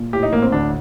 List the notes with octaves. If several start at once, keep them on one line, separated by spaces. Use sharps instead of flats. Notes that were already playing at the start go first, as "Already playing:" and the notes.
Already playing: A#2
A2 G4
D#4
A1 A#3
C4
D2 D4